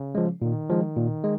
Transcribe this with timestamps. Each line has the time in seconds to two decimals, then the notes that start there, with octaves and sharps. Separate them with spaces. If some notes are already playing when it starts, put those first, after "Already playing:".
Already playing: C#3
0.15 F3 G#3
0.42 A#2 D#3
0.69 F3 G#3
0.96 A#2
1.24 G#3